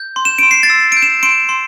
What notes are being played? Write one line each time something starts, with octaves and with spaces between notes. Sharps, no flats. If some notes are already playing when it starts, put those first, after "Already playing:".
Already playing: G6
C6
E7
C6 D7
C7
A6
E6
G6 D7
E7
C6 D7
C6